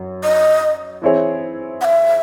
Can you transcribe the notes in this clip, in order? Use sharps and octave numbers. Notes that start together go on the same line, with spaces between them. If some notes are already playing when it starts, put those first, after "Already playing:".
Already playing: F#2
D#5
E3 C4 E4 G#4 C#5
F#5
E5